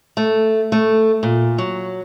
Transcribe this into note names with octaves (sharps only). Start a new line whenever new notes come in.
A3
A3
A#2
F#3